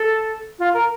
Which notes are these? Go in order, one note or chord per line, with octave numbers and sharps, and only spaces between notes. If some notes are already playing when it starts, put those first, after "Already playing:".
Already playing: A4
F4
A#4